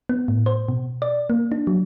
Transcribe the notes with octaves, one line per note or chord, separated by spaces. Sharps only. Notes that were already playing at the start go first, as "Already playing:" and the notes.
B3
A2
C5
B2
D5
A#3
D4
F#3